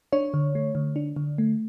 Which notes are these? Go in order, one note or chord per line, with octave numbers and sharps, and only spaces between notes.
D4 C#5
D3
A3
D3
D4
D3
A3